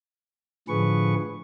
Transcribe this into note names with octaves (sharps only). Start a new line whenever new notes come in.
A2 D3 F3 G#4 B4 C#6